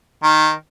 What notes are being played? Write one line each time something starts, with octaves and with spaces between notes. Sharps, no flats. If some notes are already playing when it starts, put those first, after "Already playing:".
D#3